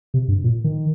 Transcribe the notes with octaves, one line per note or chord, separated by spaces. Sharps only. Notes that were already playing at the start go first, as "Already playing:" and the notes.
C3
G2
A#2
D#3